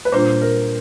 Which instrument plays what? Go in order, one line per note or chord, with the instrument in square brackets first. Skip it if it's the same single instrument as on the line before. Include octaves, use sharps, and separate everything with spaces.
[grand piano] B4
[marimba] A#2 G3 A#3 D4 F4 [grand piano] C5
[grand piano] A#4